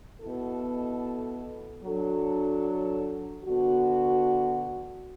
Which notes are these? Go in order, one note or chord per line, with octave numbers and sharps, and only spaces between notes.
B2 B3 E4 A4
F#3 D4 A4
D3 B3 F#4